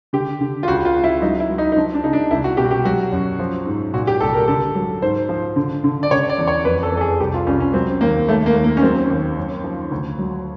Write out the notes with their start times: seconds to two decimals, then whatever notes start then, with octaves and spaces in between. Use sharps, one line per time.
0.13 D3 G4
0.41 D3
0.63 F4
0.68 C#2 F#4
0.85 F4
0.95 C#2
1.04 E4
1.22 F#3 D#4
1.40 E4
1.49 F#3
1.58 D#4
1.72 D#4
1.76 F3 D4
1.94 D4
2.03 C#3 D#4
2.13 D4
2.31 C2 E4
2.44 F#4
2.57 B2 G4
2.65 F#4
2.71 G4
2.85 F#3 F#4
3.12 F#2
3.39 F3
3.66 G#2
3.93 A#2 F#4
4.07 G4
4.20 C2 A4
4.34 A#4
4.48 D3 A4
4.75 F#3
5.02 G#2 C5
5.29 F3
5.56 D3
5.84 D3
6.03 D5
6.11 C#3 C#5
6.30 D5
6.38 E2
6.48 C#5
6.65 F2 B4
6.83 A4
6.92 F2
6.97 A4
7.01 G#4
7.20 C2 G4
7.34 F4
7.47 C2 C#4
7.60 C#4
7.74 F#3 C4
8.01 D#2 A#3
8.28 D#2 A3
8.46 A#3
8.55 D#2
8.64 A#3
8.77 C#4
8.82 F#3 C4
9.10 D#2
9.37 F#2
9.64 F3
9.91 D2
10.19 F#3